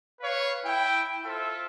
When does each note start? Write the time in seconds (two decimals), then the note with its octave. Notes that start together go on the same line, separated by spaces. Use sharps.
0.20 B4 C#5 F5
0.64 E4 G5
1.25 F4 A4 C5 E5